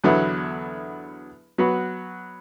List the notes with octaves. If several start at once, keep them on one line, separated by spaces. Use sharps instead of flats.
E2 D3 F#3 B3 E4
F#3 B3 F#4 B4